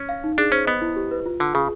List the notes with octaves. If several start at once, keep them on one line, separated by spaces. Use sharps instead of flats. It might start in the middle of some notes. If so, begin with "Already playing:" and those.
Already playing: C#4
F5
D#4
D4 G#4
C#4 C5
B3 D#5
E4
G4
B4
F4
D3 F4
C#3 G#4